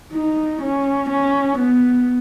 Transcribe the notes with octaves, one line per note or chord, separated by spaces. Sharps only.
D#4
C#4
C#4
B3